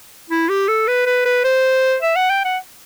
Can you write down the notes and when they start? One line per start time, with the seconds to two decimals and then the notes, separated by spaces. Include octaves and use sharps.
0.30 E4
0.49 G4
0.68 A4
0.87 B4
1.06 B4
1.25 B4
1.44 C5
2.02 E5
2.16 F#5
2.30 G5
2.45 F#5